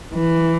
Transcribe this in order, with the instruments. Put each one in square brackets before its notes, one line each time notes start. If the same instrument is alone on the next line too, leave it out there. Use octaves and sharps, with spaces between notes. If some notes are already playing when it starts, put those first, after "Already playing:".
[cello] E3